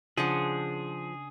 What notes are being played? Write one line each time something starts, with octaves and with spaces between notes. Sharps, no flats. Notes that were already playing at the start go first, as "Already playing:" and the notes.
C#3 F3 D4 G#4 F#5